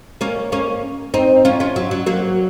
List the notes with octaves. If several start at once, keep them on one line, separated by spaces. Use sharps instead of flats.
A#3 C#4
A#3 C#4
C4 D#4
C#4 F4
C#4 F4
F#3
F#3
F#3 A#3